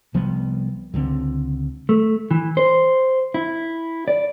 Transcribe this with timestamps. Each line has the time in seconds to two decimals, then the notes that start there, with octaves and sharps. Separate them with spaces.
0.14 C2 F3 G3 B3
0.94 C#2 D3 F3 C4
1.89 A3
2.31 E3
2.57 C5
3.34 E4
4.08 D5